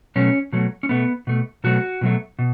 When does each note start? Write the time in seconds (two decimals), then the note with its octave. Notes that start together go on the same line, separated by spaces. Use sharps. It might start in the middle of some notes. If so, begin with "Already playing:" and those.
0.16 B2 F#3 A3 C#4
0.52 B2 F#3 A3
0.83 C#4
0.89 B2 A3 B3
1.27 B2 A3
1.64 B2 F#3 A3 F#4
2.01 B2 F#3 A3
2.39 B2